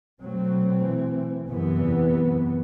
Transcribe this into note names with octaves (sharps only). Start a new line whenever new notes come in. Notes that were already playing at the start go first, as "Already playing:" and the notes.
B2 F#3 A3 C4
E3
F#2 C3 E3 B3
E2
F#2